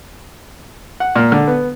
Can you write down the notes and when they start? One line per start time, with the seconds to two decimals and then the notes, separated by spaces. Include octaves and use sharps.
1.00 F#5
1.16 A#2
1.32 D3
1.47 B3